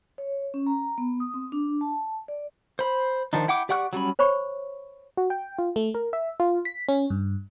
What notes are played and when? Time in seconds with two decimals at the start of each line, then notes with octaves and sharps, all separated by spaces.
0.18 C#5
0.54 C#4
0.66 A#5
0.98 B3
1.20 D#6
1.34 C4
1.52 D4
1.81 A5
2.28 D5
2.79 C5 B5
3.33 D#3 F3 D4 D#4
3.48 E4 F#5 G5 D6
3.69 G4 D5 F#5 C#6 F#6
3.93 F#3 G3 C#4 B5
4.19 C5 C#5 B5 C#6
5.17 F#4
5.30 G5
5.59 F4
5.76 A3
5.95 A#4
6.13 E5
6.40 F4
6.65 B6
6.89 C#4
7.10 G2